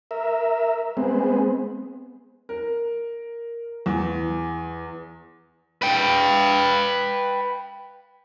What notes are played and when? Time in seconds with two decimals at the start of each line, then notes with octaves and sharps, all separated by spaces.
0.11 A#4 E5
0.97 G#3 B3 C4
2.49 A#4
3.86 E2
5.82 B4 G5